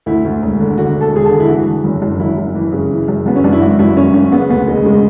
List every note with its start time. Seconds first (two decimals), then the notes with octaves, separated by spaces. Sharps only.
0.06 D2 E4
0.25 D2
0.42 E1
0.60 D3
0.78 D3 F#4
0.95 E1
1.01 A4
1.13 E1 G#4
1.25 A4
1.31 D3
1.40 E4
1.48 E3 F#4
1.67 E3
1.84 F#1
2.02 F#2
2.19 F#1 E4
2.37 F#2
2.55 E3
2.72 C#3
2.90 E3
3.08 F#2
3.26 F#2 B3
3.36 C#4
3.44 F#2 D4
3.52 E4
3.61 G#1 F#4
3.79 F#2 E4
3.96 G#1 C#4
4.14 G#1 C#4
4.32 C#3 B3
4.49 D2 B3
4.68 E1 G#3
4.85 C#3 G#3